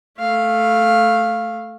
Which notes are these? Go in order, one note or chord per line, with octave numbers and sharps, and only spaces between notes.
A3 F5